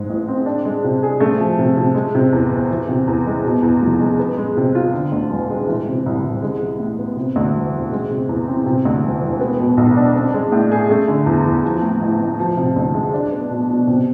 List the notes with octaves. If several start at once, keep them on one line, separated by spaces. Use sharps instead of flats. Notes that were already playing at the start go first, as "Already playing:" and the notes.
Already playing: G#2 G#3
A1
C4
D4
G#3
C3
G#4
A3
F3
C3
C3
G#3
C3
E2
E2
E3
C3
E2
G#3
B2
E2
F1
G#3
B3
G#3
C3
F4
D3
D2
E1
G#3
E3
C3
C2
C2
G#3
E3
A2
B3
C3
D2
E1
E1
G#3
C3
E2
C4
C3
D2
E1
E1
B3
B2
B1
D4
C4
G#3
A2
G#4
A3
D3
E2
E2
F3
A2
A1
A1
F3
C3
D2
G#3
D4
B3
B2
B2
C3